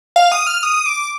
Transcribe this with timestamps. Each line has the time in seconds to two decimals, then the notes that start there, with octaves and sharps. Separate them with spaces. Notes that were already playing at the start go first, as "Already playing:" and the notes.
0.16 F5
0.32 D#6
0.47 F6
0.63 D#6
0.86 D6